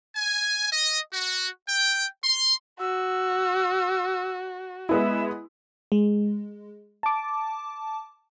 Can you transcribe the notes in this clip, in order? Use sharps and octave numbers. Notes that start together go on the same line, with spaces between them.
G#5
D#5
F#4
G5
C6
F#4 E6
G#3 B3 E4 E5
G#3
A5 D6